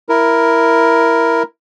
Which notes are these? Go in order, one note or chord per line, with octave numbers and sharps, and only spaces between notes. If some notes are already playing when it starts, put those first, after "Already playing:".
E4 A#4